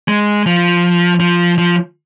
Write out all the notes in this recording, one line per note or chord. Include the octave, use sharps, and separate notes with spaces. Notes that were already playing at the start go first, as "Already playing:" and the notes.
G#3
F3
F3
F3